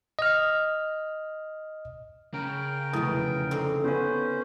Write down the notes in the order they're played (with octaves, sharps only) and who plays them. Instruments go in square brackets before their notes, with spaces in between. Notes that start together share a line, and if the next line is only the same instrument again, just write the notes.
[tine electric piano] D#5 F6
[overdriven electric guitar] C#3 [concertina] A#4 G5
[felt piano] F1 E4 D#6 [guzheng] E2 B2
[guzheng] D3 C4 D#4
[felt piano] B3 B4 [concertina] C#4 C5